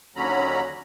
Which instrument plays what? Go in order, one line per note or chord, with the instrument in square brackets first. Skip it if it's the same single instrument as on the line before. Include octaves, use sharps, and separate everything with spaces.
[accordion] D#2 D3 F#3 C#4 A#5 B5